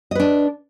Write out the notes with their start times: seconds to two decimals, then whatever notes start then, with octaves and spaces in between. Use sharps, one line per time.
0.11 D#5
0.15 B4
0.20 D4